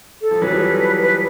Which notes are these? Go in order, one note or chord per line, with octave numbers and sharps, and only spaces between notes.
A4
F3
E3 F#3 B4
F3 G3
B4